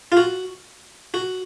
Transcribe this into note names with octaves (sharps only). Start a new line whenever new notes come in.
F4
F#4
F#4